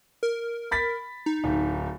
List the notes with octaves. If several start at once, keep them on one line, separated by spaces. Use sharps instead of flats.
A#4
B5 A6 B6
D#4
D1